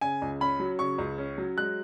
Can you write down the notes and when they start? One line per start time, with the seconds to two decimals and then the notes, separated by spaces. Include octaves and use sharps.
0.01 C#3 G#5
0.22 C#2
0.41 C#4 B5
0.60 F#3
0.79 C#3 C#6
0.98 C#2
1.18 C#4
1.38 F#3
1.57 G#3 F#6